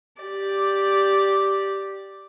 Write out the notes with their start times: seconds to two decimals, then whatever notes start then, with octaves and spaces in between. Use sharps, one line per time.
0.22 G4 D5